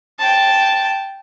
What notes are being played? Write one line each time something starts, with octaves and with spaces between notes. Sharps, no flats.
G5 A5